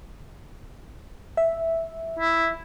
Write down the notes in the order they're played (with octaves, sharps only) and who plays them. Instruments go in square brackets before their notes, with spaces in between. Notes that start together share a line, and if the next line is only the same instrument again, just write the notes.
[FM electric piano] E5
[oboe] E4